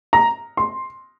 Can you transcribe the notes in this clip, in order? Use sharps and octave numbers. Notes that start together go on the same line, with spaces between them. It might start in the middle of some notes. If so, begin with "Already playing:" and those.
A#5
C6